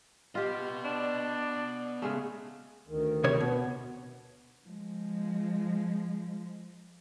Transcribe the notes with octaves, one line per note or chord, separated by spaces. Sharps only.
B3 F4 G4 D#5
D4
C#3 G#3 A3
D2 D#3
C3 C#5
B2 B3
F3 G#3